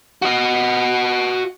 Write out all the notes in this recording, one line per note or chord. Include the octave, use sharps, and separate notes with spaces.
F#4 D#5